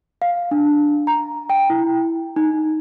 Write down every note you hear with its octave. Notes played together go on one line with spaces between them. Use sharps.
F5
D4
A#5
G5
E4
D#4